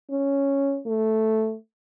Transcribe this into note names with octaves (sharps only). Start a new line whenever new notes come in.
C#4
A3